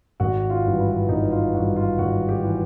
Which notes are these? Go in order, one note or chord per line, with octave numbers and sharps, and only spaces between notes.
G#1 F#4
F4
G2 E3
E4
G#1 D#4
F4
G2 E3 F#4
F4
G#1 F#4
G4
E3